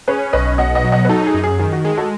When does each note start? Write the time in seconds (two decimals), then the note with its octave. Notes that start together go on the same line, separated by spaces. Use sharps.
0.08 C#4 G#4 B4
0.33 B1 B4 D#5
0.58 B2 D#5 F#5
0.75 D#5 F#5
0.84 F#3
0.92 D#5 F#5
1.05 B4
1.09 D#4 F#4 A4
1.21 A4
1.27 G#4
1.34 F#2
1.44 G#4
1.59 D#3 G#4
1.72 F#4
1.85 G#3 G#4
1.97 F#4 A4